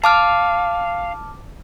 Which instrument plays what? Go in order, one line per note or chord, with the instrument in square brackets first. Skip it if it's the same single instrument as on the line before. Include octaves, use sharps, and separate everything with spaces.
[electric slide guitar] F5 [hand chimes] A5 D6 F6